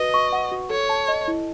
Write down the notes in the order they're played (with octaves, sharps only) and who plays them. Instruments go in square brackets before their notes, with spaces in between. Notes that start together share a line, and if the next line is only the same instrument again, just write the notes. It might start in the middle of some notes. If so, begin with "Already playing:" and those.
Already playing: [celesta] F#4 B4 [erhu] D#5
[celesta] C#6
F#5
F#4
[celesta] A4 [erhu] C#5
[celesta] A5
D#5
E4